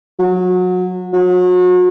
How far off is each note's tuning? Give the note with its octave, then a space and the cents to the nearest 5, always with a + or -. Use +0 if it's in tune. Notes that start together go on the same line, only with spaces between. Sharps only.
F#3 -25
F#3 -35